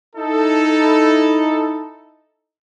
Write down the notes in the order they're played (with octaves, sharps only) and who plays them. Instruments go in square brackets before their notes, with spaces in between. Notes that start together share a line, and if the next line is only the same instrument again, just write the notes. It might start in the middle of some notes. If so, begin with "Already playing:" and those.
[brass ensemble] D#4 E4 A4